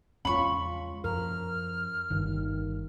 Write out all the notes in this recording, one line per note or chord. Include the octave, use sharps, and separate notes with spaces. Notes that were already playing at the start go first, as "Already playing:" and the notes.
E2 G#3 C#4 F4 B5 C#6
F#2 F3 A#4 F6
G1 G2 D#3